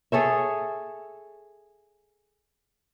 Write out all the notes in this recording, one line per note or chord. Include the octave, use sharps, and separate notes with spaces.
G#4 A4 C#5 E5